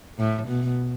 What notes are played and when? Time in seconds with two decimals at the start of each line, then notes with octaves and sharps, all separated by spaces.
0.19 A2
0.48 B2